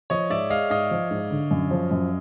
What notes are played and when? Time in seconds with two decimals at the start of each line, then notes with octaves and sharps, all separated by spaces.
0.10 F3 C#5 D#5
0.30 G#2 D5 E5
0.50 G#3 D#5 F5
0.70 G#2 D#5 F5
0.91 F3
1.11 G#2
1.31 D3
1.51 F#2
1.71 F3
1.91 F#2